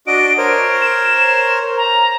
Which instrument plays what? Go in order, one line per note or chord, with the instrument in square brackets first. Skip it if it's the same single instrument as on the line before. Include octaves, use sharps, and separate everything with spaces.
[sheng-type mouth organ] D4 F#4 D#5 [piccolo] D7
[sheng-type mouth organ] A#4 C5 C#5
[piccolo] E7
A#5